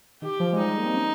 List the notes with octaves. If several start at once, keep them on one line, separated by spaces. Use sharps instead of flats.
D#3 G4
F3
G#3
G3 D#4
G#3
A#3
C4
C#4